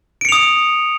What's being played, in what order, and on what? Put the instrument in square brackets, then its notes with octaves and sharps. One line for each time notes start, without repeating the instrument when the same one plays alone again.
[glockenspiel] D7
C#7
F7
D#6